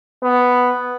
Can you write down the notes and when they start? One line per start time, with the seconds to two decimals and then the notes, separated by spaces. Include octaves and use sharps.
0.23 B3